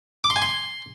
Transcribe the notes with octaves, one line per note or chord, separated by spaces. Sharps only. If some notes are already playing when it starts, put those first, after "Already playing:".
D6
C6
G#5
C6